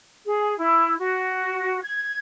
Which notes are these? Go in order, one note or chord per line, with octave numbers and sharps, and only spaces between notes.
G#4
E4
F#4
G#6